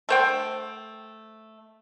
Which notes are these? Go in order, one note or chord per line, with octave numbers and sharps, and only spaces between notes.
A3 C5 G5